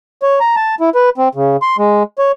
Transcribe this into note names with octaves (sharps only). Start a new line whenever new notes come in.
C#5
A#5
A5
E4
B4
C4
C#3
C6
G#3
C#5